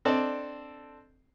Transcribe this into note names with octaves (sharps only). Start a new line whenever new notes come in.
C4 D4 A4 D5 D#5